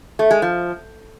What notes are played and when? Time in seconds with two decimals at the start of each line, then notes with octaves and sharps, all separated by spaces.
0.19 A3
0.31 G#3
0.42 F3